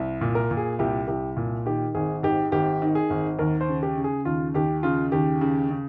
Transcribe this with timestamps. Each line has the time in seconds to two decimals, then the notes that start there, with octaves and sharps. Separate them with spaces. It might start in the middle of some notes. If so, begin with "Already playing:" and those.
Already playing: C2
0.21 A#2
0.35 A#4
0.51 A#2
0.57 G#4
0.79 C2 G4
1.07 C2 G4
1.37 A#2
1.66 D#3 G4
1.95 G#1 G#4
2.23 G#2 G4
2.52 G#1 G4
2.82 D#3
2.95 G#4
3.10 G#1
3.39 D#2 A#4
3.61 C5
3.69 C#3
3.83 G4
3.97 C#3
4.04 G#4
4.25 D#2 F4
4.54 D#2 G4
4.83 C#3 F4
5.12 D#2 G4
5.41 C#3
5.71 C#3